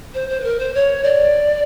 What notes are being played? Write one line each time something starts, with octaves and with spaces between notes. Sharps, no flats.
C5
C5
B4
A#4
C5
C#5
D5